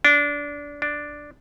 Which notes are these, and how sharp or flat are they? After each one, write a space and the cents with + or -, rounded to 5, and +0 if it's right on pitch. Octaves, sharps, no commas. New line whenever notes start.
D4 -20
D4 +0